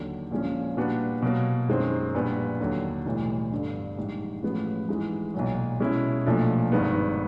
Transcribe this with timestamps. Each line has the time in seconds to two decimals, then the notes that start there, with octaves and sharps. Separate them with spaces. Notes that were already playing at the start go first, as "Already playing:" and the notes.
Already playing: D#2 D3 F#3
0.31 A#1 A#2 F3 G#3 C#4
0.77 A#2 G3 B3 D4 F#4
1.22 B2 F#3 A#3
1.68 F#2 D#3 G#3 C4
2.15 A#1 A#2 G3 B3
2.60 D#2 D3 F#3
3.05 B1 A2 E3 G3
3.51 G1 G2 D3
3.97 A#1 G#2 D#3 G3
4.43 A1 A2 F3 G#3 B3
4.89 G#2 E3 G#3
5.34 B1 A#2 F#3
5.80 B2 G#3 C#4 E4
6.26 B1 A#2 F3 A3 D4
6.72 G#1 G2 D#3 G#3 B3